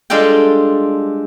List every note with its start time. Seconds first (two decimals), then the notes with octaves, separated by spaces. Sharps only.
0.10 G3 G#3 D4 F4 A4 G5